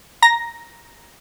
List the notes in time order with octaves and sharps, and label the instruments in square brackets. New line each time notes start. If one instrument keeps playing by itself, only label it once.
[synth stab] A#5 A#6